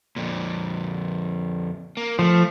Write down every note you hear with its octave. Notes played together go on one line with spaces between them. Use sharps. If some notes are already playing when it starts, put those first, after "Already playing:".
F2 A#2
A#3
F3 A3